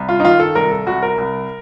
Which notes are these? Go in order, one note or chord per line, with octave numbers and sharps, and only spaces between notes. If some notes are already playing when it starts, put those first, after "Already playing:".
Already playing: C2
F4
D#4
D#3 F4
A4
C2 A#4
A4
C2 F#4
A#4
C2